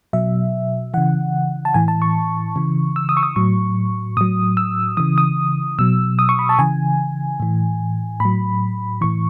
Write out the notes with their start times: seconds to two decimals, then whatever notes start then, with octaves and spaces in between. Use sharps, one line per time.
0.13 B2 F#3 E5
0.94 C#3 E3 F#5
1.65 A5
1.74 A2 E3 G#5
1.88 A5
2.02 C#6
2.56 C#3 E3
2.96 E6
3.09 D#6
3.17 C#6
3.23 D#6
3.36 A2 F#3 C#6
4.17 A2 F#3 D#6
4.57 E6
4.97 C#3 E3 D#6
5.18 D#6
5.79 B2 F#3 E6
6.19 D#6
6.29 C#6
6.39 B5
6.49 A5
6.59 C#3 E3 G#5
7.40 A2 E3
8.20 A2 F#3 B5
9.01 A2 E3 C#6